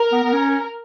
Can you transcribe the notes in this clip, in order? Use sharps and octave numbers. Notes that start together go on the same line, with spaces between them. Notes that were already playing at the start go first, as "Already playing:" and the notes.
Already playing: A#4
B3
B3
C#4